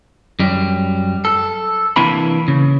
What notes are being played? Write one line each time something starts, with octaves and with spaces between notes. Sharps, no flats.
F#2 G3
A4
C3 E3 A#3 D4 A5 B5
C#3